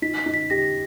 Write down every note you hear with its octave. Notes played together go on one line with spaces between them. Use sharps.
D#4 B6
B6
D#4
B6
G4 A#6